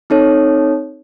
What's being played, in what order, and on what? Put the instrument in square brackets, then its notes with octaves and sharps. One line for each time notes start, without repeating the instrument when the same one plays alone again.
[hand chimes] C4 D#4 A4 C#5